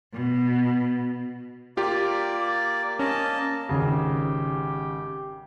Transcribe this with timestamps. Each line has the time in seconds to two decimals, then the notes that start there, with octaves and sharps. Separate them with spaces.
0.13 B2
1.77 A#3 F4 G4 D5
2.99 A#3 C#4 D#5 A5
3.69 G#1 C#3 G4